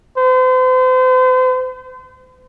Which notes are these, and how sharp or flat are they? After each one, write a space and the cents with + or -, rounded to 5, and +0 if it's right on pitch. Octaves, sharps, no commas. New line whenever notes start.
C5 -40